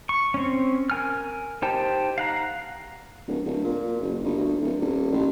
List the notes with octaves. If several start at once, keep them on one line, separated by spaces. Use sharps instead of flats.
C#6
C4 C#4
A#4 G#5 F6
D#4 G4 C5 G5 A5
F5 F#5 A#5
D1
D1
A#2
F#1
G1
D2
D1
D#1
A1